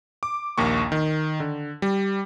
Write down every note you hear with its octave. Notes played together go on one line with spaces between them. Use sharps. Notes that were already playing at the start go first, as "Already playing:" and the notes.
D6
A#1 D#2 A#3 C#6
D#3
D3
G3